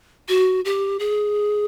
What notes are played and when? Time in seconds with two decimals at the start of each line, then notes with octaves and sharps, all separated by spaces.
0.29 F#4
0.65 G4
1.00 G#4